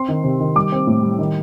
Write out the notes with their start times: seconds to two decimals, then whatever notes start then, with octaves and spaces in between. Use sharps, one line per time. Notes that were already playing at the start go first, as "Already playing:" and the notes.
Already playing: C4 C6
0.08 D#3
0.24 C3
0.40 D#3
0.55 G3 D6
0.72 C4
0.87 A2
1.03 G3
1.19 D#3